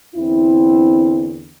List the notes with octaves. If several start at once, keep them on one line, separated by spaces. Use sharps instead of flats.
E2 D3 C4 E4